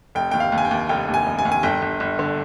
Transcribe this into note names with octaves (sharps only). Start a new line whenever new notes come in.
F1 G5
D#2 G5
F5
D#2
G#5
G5
D#2
F1 G5
D#2
G#5
F1
G#5
D#2
G#5
G1 G5
G1
G1
D3